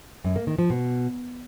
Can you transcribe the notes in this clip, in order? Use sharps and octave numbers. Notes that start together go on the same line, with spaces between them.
F#2
A#3
D#3
F3
B2